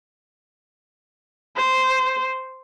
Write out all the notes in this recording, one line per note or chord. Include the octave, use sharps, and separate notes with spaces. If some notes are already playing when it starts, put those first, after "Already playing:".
C5